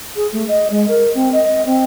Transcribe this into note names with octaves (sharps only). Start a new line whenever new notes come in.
G#4
A3
D#5
G#3
A#4
C4
D#5
C4